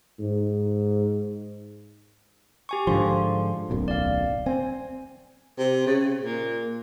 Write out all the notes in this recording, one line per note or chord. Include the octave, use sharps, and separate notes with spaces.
G#2
G4 G#5 C#6
G#2 D3 F3 C6
D1 B1 F#2
D5 F5
C4 G#5
C3
C#3
A#2